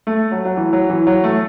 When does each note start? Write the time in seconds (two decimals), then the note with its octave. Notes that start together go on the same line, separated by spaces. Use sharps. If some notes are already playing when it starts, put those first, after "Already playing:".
0.07 A3
0.32 F#3
0.45 F#3
0.57 E3
0.73 F#3
0.90 E3
1.07 F#3
1.24 A3